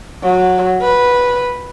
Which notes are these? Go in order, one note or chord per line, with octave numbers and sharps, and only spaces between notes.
F#3
B4